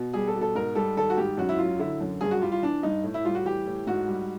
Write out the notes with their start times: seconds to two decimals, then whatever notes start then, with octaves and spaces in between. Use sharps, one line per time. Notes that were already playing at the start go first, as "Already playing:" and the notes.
Already playing: B2
0.14 G3 G#4
0.27 A4
0.35 B2
0.41 A4
0.55 G#2 A#4
0.75 G3 A4
0.97 D#3 A4
1.10 F#4
1.17 G#2 G4
1.38 F#2 F#4
1.49 E4
1.58 F#3 F4
1.79 D3 E4
2.00 F#2
2.21 G2 G#4
2.31 F#4
2.42 G3 F4
2.52 F4
2.62 E3 D4
2.83 G2 D#4
3.03 A2
3.14 E4
3.25 G3 F4
3.35 F#4
3.45 E3 G4
3.66 A2
3.87 G#2 F#4
4.08 G3